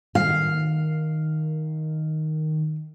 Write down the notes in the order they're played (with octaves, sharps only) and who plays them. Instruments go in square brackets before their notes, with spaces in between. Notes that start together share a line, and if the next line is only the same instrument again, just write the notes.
[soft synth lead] D#3 [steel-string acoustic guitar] F5